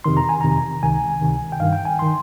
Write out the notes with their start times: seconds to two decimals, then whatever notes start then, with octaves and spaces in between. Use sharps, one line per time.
0.04 F2 C3 D#3 C6
0.17 A#5
0.29 G#5
0.41 F2 C3 D#3 A#5
0.82 C#2 C3 D#3 G#5
1.21 C#2 C3 D#3
1.52 G5
1.60 G2 D#3 F5
1.73 G5
1.85 G#5
1.99 D#3 C6